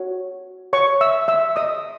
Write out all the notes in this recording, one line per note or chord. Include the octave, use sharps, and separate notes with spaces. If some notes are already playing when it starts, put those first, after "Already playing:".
Already playing: F#4 C#5
C#5 C#6
E5 E6
E5 E6
D#5 D#6